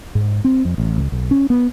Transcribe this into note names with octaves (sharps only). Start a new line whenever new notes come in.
G#2
C4
F2
A1
C#2
B1
C#4
B3